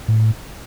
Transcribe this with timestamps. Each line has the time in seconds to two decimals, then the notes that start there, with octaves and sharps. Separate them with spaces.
0.08 A2